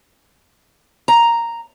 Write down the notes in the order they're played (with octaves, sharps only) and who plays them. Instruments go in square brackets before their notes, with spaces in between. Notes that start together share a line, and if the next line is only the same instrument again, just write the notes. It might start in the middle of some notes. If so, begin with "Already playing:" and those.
[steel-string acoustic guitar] A#5